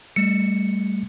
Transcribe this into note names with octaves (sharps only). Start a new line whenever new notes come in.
G3 A3 C#7